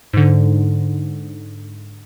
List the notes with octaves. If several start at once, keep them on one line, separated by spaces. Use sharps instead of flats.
G#2 D3